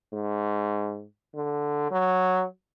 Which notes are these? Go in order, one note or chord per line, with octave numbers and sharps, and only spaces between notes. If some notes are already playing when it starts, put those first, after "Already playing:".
G#2
D3
F#3